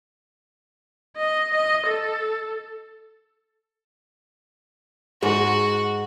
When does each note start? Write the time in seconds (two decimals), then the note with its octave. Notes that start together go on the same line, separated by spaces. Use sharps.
1.16 D#5
1.55 D#5
1.87 A4
5.22 G#2 G#3 F#4